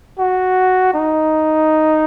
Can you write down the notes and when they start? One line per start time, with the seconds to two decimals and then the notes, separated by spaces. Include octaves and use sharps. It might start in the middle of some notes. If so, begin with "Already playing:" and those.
0.19 F#4
0.94 D#4